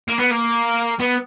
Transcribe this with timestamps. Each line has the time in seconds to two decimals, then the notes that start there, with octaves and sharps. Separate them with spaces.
0.08 A#3
0.20 B3
0.31 A#3
0.99 B3